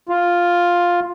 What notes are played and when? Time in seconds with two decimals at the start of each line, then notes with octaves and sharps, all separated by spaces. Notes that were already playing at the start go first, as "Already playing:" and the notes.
0.09 F4